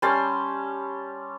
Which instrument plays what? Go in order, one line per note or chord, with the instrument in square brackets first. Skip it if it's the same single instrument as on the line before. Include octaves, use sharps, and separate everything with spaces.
[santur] G3 C#4 A5 C6